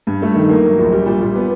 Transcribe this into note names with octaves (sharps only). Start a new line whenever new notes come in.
G2
A3
D#3
A#3
F#3
A#1
G3
A#2
A#2
B3